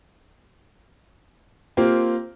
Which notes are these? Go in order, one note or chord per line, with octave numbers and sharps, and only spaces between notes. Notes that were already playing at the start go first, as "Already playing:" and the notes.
A#3 C4 F4 G4